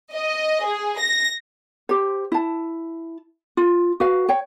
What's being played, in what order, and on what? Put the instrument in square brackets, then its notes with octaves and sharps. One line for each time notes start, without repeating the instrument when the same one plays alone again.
[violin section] D#5
G#4
A#6
[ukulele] G4 C5
E4 A5
F4
F#4 B4 F5
C#5 G5